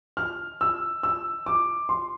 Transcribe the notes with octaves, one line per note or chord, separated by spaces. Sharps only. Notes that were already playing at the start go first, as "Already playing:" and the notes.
F6
E6
E6
D6
C6